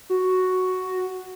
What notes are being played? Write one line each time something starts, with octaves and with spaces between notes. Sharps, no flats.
F#4